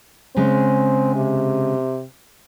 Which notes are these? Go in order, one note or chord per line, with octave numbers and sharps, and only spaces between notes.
C#3 G#3 C4
C3